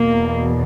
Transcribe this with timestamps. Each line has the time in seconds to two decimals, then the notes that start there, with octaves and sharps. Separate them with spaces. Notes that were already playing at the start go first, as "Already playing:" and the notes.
Already playing: E2 B2 A#3